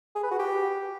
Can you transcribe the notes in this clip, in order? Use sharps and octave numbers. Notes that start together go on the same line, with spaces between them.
G#4
B4
F#4
G4